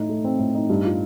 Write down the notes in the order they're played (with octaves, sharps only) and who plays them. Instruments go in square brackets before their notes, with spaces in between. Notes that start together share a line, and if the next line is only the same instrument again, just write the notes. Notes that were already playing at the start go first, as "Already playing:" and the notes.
Already playing: [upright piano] A2 D#4
A3
C4
A2
D#4
G2
F4